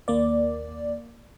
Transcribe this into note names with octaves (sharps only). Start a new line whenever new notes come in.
D#2 A#3 D5